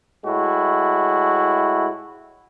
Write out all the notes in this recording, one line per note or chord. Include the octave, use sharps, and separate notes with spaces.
A2 G#3 E4 F#4